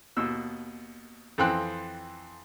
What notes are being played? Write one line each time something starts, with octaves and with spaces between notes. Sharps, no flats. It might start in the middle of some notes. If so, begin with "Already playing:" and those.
D#2 B2 E6
F2 E3 C4 G5 C6 F#6